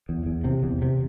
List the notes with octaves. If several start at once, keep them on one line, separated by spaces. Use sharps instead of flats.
E2
E2
C3
E2
C3